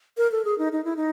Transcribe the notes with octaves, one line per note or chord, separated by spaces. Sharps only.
A#4
A4
G#4
D#4
D#4
E4
D#4